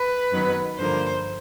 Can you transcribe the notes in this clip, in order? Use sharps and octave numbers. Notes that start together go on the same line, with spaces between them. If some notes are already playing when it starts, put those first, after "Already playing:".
Already playing: B4
F#2 D#3 F#3 B3
G2 D3 F3 A#3 C5